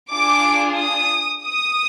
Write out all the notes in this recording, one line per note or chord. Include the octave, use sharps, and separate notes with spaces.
D4 F4 G#4 D6
D#6
D#6